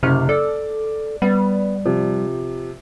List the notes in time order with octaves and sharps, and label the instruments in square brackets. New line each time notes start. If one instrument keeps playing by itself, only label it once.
[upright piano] F#1 F6 [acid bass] C3
[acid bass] A4 [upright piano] D5
[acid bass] G3 [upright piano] B3
[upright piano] C3 F3